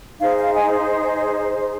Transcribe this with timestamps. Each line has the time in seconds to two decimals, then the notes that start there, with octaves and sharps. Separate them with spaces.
0.19 D#4 G#4 C5 F5
0.38 F5
0.54 D#5 G#5